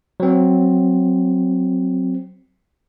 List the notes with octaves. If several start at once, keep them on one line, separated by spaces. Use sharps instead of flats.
F#3 C4